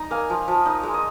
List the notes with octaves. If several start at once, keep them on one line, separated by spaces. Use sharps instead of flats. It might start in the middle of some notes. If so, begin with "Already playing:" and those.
Already playing: D#4 A#5
A#3 F5 G#5
F3
F3
D#4
G#3
D#5